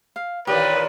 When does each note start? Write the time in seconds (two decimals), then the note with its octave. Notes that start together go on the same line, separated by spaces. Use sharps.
0.16 F5
0.47 D#2 A#2 E3 G4 B4 D5